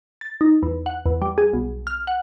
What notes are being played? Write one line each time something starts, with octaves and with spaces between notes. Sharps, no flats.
A6
D#4
E2
F#5
E2
G3
G#4
B1
F6
F#5